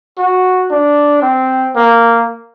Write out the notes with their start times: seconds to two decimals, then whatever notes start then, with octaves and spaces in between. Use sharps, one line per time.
0.18 F#4
0.71 D4
1.22 C4
1.76 A#3